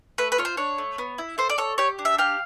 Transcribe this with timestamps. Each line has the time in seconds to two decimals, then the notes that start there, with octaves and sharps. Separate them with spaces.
0.18 A3 B4
0.32 B4
0.38 F4 C#5
0.45 C5
0.57 D4 C#5
0.78 A3
0.98 B3
1.18 E4
1.38 A4 C5
1.49 D5
1.58 A4 C#5
1.78 G4 C#5
1.99 D4
2.05 E5
2.18 G4 F5